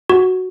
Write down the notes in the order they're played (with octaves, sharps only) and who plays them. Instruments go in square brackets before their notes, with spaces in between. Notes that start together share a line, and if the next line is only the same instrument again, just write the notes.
[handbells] F#4